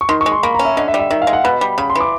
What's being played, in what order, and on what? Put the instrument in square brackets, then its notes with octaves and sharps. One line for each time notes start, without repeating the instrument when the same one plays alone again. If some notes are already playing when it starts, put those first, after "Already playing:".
[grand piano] C#6
[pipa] D#3 [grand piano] C6
[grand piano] C#6
[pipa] G#3
[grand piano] C6
[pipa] A#3 [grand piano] B5
[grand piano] A#5
[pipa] C#4
[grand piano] E5
[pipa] D3 [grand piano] D#5
[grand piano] E5
[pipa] G3
[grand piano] E5
[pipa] D#3 [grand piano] E5
[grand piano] F5
[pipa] G#3
[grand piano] F#5
[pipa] B2 [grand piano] B5
[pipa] G3
[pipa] C#3 [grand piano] B5
[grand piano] C6
[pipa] E3 [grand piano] D6